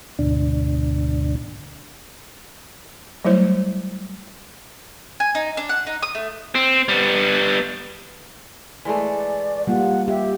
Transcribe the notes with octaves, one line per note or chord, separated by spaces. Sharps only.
D2 G#2 B2 D3 D4
F#3 G3 A3 E4 C5
G#5
D#4
D4
F#5
D#4
D#6
A3
C4
G3 B3
E3 G#3 A3 D5
G3 A#3 F4 F#5
G4 E5